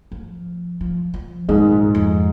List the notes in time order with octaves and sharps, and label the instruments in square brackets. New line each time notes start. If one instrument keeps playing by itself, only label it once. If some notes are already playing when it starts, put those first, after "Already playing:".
[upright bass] F3
F3
F3
[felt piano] G#2 G#3 [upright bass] D#3
[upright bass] A#2
F2